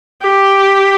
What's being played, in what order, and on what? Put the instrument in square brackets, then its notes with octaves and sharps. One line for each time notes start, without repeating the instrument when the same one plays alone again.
[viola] G4